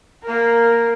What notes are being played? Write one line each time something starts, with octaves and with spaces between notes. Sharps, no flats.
A#3 A#4